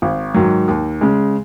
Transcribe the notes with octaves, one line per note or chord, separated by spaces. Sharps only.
G#1
G#2 D#3 F#3
D#2
C#3 G#3